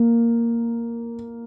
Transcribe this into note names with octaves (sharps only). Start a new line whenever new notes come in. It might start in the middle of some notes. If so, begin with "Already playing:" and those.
Already playing: A#3